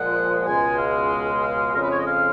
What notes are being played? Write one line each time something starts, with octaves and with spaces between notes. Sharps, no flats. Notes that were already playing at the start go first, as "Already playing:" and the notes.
Already playing: A#2 F3 G#3 F#5
C#2 B2 G#3 G#5
F5
F5
F2 C#3 G#3 A#4
B4
C#5
D#5
F5